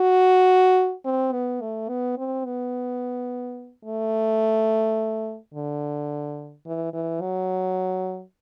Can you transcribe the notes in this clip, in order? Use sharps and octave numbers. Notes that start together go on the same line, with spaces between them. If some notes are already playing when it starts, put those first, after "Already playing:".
Already playing: F#4
C4
B3
A3
B3
C4
B3
A3
D3
E3
E3
F#3